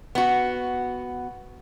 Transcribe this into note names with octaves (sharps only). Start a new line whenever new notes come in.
B3 F#4